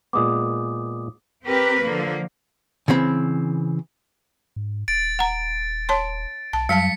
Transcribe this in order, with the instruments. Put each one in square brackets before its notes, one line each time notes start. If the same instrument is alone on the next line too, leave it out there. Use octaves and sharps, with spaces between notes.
[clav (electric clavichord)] A#2 G#3 B3 [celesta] D6 D#6
[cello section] C4 G4 A#4 B4
D3 F3 A#3
[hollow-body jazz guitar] C#3 E3 C4 B5
[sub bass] G#2
[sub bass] D#1 [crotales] A6 D7
[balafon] F#5 A#5
C#5 A5 C6
[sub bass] B1 [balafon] A5
[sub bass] F#2 [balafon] F#3 G3 A5 [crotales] B6 C#7